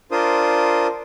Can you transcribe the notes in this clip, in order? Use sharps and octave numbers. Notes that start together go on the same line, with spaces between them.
D4 F4 A#4 C5 D#6